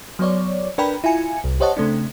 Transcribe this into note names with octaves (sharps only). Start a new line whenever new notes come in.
F#3 B3 C#5 D5
D4 A#4 B4 G5 B5
E4 F4 G#5 C#7
C2
G4 C5 C#5 D#5 F#5 A5
C#3 A3 C4 D4